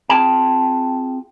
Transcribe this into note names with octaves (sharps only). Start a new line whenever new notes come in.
C4 F4 G#4 G5 A5